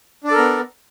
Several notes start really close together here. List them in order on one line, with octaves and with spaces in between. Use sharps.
D4 D5 A4 A#4 B3